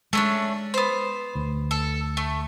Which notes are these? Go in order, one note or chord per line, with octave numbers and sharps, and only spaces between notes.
G#3 A3 C#4 D4
B3 C5
D2
A4
A3